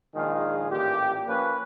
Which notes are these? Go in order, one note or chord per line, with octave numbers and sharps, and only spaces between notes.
A#1 D#3 G#3 F4 G#4
A1 A#2 G4
F3 A#3 C#4 B4